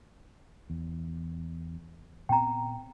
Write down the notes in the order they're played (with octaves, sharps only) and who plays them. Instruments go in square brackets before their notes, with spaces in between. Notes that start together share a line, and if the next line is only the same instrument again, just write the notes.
[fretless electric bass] E2
[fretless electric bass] A#2 B3 C4 [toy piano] G5 A#5